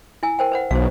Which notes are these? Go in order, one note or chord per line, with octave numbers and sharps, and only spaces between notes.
E4 G#5 E6
A#4 C5 G5
B4 C5 F#5
B1 C5 F5